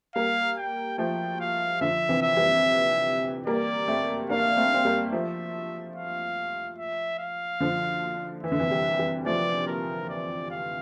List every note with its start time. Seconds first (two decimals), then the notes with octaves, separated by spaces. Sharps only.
0.15 G3 A#3 F5
0.58 G5
0.98 F3 A3 G5
1.40 F5
1.81 D3 F3 E5
2.09 C3 E3
2.22 E5
2.36 E3 G3
3.46 G3 A#3 D5
3.88 A3 C4
4.30 A#3 D4 F5
4.57 A3 C4
4.74 C4
4.85 G3 A#3
5.12 F3 A3 E5
5.96 F5
6.78 E5
7.19 F5
7.61 D3 F3
8.43 E3 E5
8.52 D3
8.60 C3 E3
8.71 E3 G3
8.98 E3 G3
9.26 F3 A3 D5
9.67 A#4
10.09 D5
10.51 F5